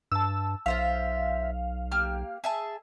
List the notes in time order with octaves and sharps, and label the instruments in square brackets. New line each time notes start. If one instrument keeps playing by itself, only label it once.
[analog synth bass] G2 [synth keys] A5 E6
[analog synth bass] B1 [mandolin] F4 C5 E5 [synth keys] F5
[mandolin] A#3 G4 F6
G#4 E5 A5